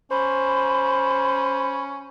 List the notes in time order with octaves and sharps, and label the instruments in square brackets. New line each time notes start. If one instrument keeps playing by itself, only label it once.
[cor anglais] C#4 [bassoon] C5 [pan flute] B5